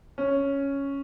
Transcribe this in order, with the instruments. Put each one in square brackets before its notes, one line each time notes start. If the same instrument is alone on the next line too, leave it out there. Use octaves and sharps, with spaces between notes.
[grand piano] C#4